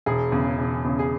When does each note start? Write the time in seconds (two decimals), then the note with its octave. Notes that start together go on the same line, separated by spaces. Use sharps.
0.06 E1 G#4
0.32 E2 C#3
0.58 E1
0.84 E2 C#3
0.99 G#4